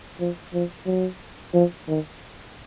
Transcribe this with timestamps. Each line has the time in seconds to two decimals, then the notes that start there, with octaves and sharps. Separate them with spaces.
0.20 F3
0.53 F3
0.86 F#3
1.53 F3
1.88 D#3